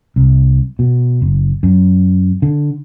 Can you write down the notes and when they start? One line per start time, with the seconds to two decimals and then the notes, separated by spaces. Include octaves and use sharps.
0.16 C2
0.79 B2
1.22 F#1
1.63 F#2
2.42 D3